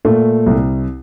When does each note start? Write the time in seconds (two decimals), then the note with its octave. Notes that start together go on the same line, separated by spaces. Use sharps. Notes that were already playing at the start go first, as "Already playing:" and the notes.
0.05 A#2 A3
0.46 C2